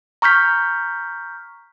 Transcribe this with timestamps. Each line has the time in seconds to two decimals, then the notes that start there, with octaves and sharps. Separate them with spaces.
0.22 A#5 C#6 F6 G6 B6